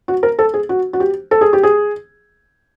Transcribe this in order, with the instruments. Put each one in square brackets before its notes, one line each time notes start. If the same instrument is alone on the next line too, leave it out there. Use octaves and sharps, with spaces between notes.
[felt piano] F#4
A#4
A4
G#4
F#4
F#4
G4
A4
G#4
G4
G#4